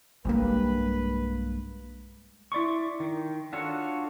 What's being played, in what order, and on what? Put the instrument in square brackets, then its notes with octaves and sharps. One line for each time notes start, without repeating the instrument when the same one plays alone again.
[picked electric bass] B1 G3 A#3 [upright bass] G2 G#3 [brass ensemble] B4
[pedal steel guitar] E4 D5 C6 C#6
D#3
D4 F4 F#4 A4 C#5